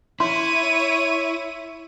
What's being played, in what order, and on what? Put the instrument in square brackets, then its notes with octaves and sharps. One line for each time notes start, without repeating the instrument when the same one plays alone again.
[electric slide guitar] E4 [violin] C#5 D#7 [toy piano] C6